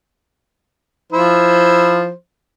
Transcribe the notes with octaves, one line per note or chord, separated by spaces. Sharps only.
F3 E4 C5